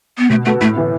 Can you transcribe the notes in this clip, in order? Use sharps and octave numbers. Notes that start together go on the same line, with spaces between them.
B3
B2 A3
A3 B3 F#4 A4
A2 A3
E3 B3